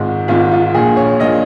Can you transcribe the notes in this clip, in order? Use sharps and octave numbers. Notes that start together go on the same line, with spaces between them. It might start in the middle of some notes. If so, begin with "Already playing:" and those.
Already playing: G#1 G#2 G#3 F4
G#1 G#2 G#3 F4
F4
A#1 A#2 A#3 G#4
C#5
A#1 A#2 A#3 D#5